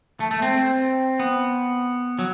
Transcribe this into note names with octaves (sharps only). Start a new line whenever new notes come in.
A3
A3
C4
B3
F#3